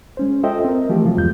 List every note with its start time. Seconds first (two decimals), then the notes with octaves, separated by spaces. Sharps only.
0.17 G#3 C#4 C5
0.43 F4 A4 C5 D#5 E5 G5
0.65 C4 A#4
0.89 E3 F3 A3 G4
1.05 C3 F3 F#3 F4
1.17 E2 G2 G#3 G6